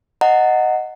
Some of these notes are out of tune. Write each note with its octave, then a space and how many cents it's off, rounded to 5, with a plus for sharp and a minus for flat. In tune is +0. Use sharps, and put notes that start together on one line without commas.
D#5 +0 F#5 +0 A#5 -35